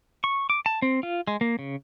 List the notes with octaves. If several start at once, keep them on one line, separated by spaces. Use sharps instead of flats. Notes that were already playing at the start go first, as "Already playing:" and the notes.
C#6
D6
A5
C4
F4
G#3
A#3
C#3